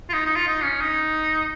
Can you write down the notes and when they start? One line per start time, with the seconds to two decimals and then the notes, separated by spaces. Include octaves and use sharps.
0.09 F4
0.13 D#4
0.26 D#4
0.36 F4
0.48 D#4
0.64 C#4
0.81 D#4